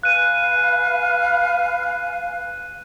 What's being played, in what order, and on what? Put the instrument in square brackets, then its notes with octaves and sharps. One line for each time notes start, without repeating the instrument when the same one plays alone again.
[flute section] B4 F5 G#5 [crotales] F#6 D#7